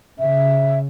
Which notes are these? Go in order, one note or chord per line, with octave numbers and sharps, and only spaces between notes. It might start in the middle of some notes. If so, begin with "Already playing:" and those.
C#3 E5